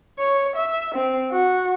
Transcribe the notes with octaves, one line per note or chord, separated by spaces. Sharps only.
C#5
E5
C4
F#4